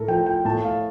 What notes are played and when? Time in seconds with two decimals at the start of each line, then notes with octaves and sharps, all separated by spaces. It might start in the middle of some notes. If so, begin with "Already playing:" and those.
Already playing: A2 A4 A#4
0.08 F3 G5
0.26 G5
0.45 A2 A5
0.64 F5